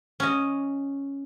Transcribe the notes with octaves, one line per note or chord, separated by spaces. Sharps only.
C#4 D#5